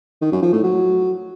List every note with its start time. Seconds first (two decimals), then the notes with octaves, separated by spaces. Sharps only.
0.21 D#3
0.32 F#2
0.42 F3
0.53 A2
0.63 F#3